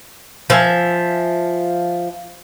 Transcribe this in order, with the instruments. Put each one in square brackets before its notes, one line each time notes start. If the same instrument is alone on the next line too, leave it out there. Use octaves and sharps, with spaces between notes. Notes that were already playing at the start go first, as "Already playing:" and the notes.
[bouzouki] F3 E5 G#5